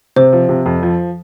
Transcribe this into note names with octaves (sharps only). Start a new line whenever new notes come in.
C3 C5
F3
C3
F2
F3